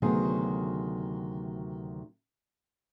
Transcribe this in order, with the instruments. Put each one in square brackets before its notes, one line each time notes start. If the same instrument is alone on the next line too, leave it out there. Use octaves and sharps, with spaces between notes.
[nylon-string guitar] D2 C3 D#3 F#3 B3 G#4